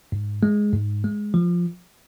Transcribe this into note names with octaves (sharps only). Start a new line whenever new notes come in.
G#2
G#3
G#2
G#3
F3